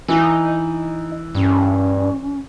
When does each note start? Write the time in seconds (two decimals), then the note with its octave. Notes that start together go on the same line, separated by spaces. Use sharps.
0.08 E3 D#4
1.35 G2 C#4